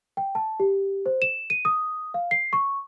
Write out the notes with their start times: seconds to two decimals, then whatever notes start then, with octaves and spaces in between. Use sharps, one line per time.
0.17 G5
0.35 A5
0.60 G4
1.06 C5
1.22 E7
1.50 D#7
1.65 D#6
2.14 F5
2.31 C7
2.53 C#6